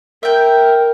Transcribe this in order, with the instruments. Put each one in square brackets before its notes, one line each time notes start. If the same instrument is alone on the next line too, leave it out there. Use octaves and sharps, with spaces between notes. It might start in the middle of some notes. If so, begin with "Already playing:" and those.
[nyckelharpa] A#4 [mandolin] E5 G5